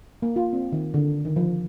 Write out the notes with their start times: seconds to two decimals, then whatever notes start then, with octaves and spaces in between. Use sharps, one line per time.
0.22 A#3
0.36 F4
0.53 C4
0.72 D#3
0.94 D3
1.25 D#3
1.36 F3